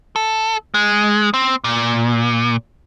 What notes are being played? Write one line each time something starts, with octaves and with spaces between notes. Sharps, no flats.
A4
G#3
C4
A#2